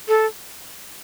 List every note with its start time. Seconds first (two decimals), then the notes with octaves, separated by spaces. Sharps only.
0.08 A4